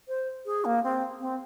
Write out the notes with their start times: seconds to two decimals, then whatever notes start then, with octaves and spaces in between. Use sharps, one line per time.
0.08 C5
0.46 G#4
0.65 A#3
0.83 C4
1.20 C4